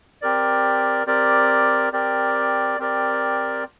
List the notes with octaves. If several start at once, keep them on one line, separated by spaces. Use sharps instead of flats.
C4 G4 A#4 D5
C4 G4 A#4 D5
C4 G4 A#4 D5
C4 G4 A#4 D5